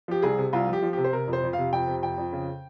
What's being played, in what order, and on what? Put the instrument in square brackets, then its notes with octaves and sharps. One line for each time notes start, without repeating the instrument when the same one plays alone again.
[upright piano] F3 G4
C2 G#4
C3
C2 F4
F3
G4
F3
C3 G4
C5
C3 A#4
F2
C5
F2
C3 F5
F2 G5
C3
F2 G5
F2
C#3